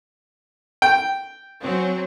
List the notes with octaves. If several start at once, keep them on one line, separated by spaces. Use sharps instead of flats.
G5
F#3 C4 C#4